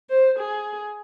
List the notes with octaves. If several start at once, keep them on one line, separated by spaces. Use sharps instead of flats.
C5
G#4